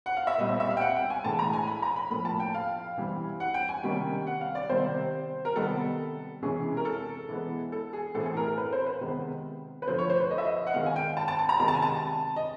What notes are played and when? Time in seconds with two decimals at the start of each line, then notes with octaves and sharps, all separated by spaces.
0.06 F#5
0.17 F5
0.27 E5
0.38 A#2 G3 C4 D#5
0.49 E5
0.60 E5
0.70 F5
0.77 G5
0.81 F#5
0.96 G5
1.10 G#5
1.24 A2 E3 G#3 A5
1.39 A#5
1.53 G#5
1.67 B5
1.82 A#5
1.96 B5
2.10 A2 F3 A#3 B5
2.25 A5
2.40 G5
2.54 F5
2.98 E3 G3 C4
3.40 F#5
3.54 G5
3.69 G#5
3.83 C3 D#3 G3 A#3 C#4 G5
4.27 F#5
4.41 F5
4.55 D5
4.69 C3 D#3 G3 C4 C5
5.45 A#4
5.56 C3 D#3 G3 B3 A4
6.42 C3 E3 G#3 C#4 G#4
6.77 A#4
6.85 A4
7.29 E3 G#3 B3
7.72 A4
7.93 G#4
8.14 A2 E3 A3 C4 A4
8.20 G#4
8.26 A4
8.37 A#4
8.47 A#4
8.58 B4
8.73 C5
8.86 B4
9.01 C3 D#3 G#3 B3
9.82 B4
9.87 D3 F3 A3 C5
9.99 C#5
10.10 C5
10.20 B4
10.31 D#5
10.38 E5
10.45 D#5
10.67 F#5
10.74 D#3 G#3 C4 F5
10.86 G#5
10.96 G5
11.17 A5
11.28 A5
11.39 A5
11.49 A#5
11.60 C3 D#3 G#3 A#5
11.68 A5
11.75 G#5
11.82 A5
12.36 D#5